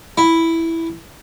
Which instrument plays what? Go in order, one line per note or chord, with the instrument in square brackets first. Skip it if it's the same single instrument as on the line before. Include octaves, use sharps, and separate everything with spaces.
[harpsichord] E4